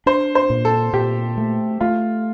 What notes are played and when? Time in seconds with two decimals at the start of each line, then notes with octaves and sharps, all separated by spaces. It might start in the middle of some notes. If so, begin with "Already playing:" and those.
0.06 D4 C5
0.35 C5
0.50 A#2
0.65 A4
0.93 A#2 G4
1.37 A3
1.81 A3 F4